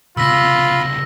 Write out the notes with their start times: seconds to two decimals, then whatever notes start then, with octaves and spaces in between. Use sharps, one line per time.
0.17 C#2 C3 F4 B5 E6 A#6